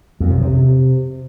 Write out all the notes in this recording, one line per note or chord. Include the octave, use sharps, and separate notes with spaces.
F2
C3
C3